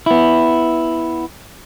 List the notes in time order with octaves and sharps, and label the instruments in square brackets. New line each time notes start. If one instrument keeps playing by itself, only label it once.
[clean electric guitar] B3 E4